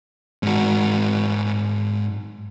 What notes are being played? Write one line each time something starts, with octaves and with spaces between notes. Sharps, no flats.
G#2 F#4